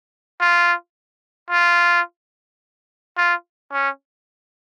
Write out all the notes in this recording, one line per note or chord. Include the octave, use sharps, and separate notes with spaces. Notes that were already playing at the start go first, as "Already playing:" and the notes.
F4
F4
F4
C#4